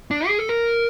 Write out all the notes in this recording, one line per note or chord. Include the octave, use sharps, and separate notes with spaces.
D4
G#4
A4
A#4